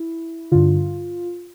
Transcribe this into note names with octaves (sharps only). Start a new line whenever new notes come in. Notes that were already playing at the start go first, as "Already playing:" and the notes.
Already playing: E4
G2 D3 F4